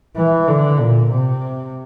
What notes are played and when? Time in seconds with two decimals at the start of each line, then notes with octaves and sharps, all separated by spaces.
0.16 E3
0.48 D3
0.80 A#2
1.11 C3